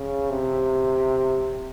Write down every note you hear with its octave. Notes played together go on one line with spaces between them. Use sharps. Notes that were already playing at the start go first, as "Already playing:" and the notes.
Already playing: C#3
C3